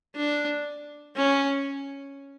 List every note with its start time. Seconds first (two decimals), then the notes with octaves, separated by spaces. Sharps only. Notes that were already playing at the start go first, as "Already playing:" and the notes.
0.16 D4
1.16 C#4